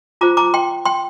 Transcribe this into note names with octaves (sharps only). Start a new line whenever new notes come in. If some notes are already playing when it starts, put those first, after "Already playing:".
F4 C5 A#5 D6
A#5 D6
G5 C6
G5 C6